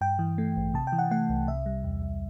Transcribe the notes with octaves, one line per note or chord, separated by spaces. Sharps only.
G2 G5
E3
A3
A1
C3 A5
G5
E3
F#5
A3 F#5
C2
C3 E5
G3
E2
E2